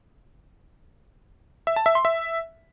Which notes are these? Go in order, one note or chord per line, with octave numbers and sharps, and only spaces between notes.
E5
A5
E5
C6
E5